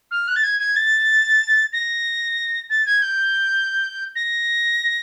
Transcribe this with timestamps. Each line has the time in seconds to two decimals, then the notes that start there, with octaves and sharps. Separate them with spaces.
0.11 F6
0.27 F#6
0.36 A6
0.43 G#6
0.59 G#6
0.76 A6
1.72 A#6
2.69 A6
2.86 G#6
3.02 G6
4.15 A#6